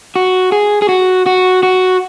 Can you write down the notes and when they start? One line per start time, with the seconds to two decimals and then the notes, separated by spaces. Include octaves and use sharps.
0.16 F#4
0.52 G#4
0.82 G#4
0.89 F#4
1.26 F#4
1.63 F#4